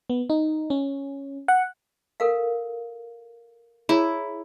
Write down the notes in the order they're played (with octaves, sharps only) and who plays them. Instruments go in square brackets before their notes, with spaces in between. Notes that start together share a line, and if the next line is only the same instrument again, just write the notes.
[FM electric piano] B3
D#4
C#4
F#5
[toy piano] A4 A#4 F5
[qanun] E4 [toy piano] G#4 C#5 A#5